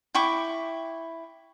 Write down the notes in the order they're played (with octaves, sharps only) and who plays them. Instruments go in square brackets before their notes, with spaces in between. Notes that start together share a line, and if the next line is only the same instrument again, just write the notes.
[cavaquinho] E4 G5 C#6 D6